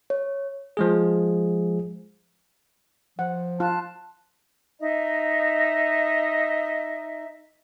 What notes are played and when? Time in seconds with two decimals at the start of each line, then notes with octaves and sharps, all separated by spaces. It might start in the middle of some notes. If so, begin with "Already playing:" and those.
0.10 C#5
0.77 F3 G#3 G#4
3.19 F3 F#5
3.60 F4 A5 F#6
4.79 D#4 D#5 E5